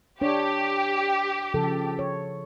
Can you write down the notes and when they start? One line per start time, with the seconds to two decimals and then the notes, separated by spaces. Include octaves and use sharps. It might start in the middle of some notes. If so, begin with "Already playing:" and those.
0.22 D4 G4 C#5
1.54 C#3 F3 A4
1.99 C#5